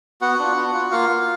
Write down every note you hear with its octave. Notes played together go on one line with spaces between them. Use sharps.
B3 F#4 F#5
D4 F4
B3
F4
A#3 F4 F5
F4